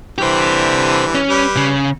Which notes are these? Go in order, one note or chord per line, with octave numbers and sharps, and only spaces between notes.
D3 E3 G3 G4 C5
C#4
G3 B4
C#3